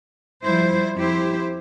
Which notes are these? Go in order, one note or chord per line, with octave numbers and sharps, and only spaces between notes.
F3 G3 E4 C5
F2 E4 G4 C5